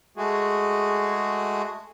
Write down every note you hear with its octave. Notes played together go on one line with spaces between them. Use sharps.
G#3 A3 F#4 G#4